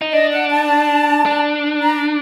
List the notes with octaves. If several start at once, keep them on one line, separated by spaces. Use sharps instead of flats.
D#4
D4 D#5
F#5
A5
D4
A#5